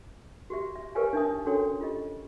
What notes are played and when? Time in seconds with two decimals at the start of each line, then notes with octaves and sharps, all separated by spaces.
0.50 F#4 G4 E5
0.76 E5
0.95 G4 A#4 B4 C#5 F5 G#5
1.13 D4 D#4 E5 D#6
1.45 C#4 D4 F#4 A4 C#5 G5
1.81 F4 G4 D#5